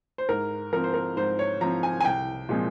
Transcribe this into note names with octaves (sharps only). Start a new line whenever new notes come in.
C5
G#2 A#4
F3 C4 A#4
C5
A#4
G#2 C5
C#5
F3 C4 A#5
G#5
G#5
C2 G5
A#2 F3 G#3 C4